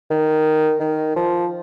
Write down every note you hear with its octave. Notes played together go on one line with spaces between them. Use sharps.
D#3
D#3
F3